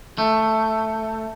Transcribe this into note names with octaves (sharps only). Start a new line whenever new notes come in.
A3